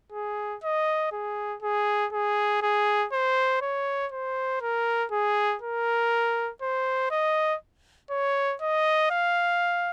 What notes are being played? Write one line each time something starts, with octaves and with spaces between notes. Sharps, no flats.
G#4
D#5
G#4
G#4
G#4
G#4
C5
C#5
C5
A#4
G#4
A#4
C5
D#5
C#5
D#5
F5